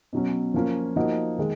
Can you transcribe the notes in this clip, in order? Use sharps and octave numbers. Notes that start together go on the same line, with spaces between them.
B2 F#3 C#4
F3 A#3 C#4 F4
F3 A#3 D#4 F#4
D#3 G#3